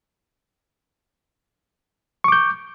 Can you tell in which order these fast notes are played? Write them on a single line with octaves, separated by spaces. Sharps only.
C#6 D6 G6